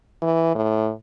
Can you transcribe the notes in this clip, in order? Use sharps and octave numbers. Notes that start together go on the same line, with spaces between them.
E3
A2